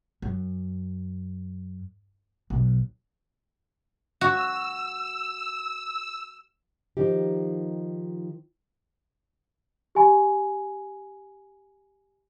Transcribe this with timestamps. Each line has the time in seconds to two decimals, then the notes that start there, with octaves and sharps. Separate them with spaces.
0.22 F#2
2.50 B1
4.21 F#4 E6
6.97 D#3 F3 D#4 G4
9.95 G4 G#5 B5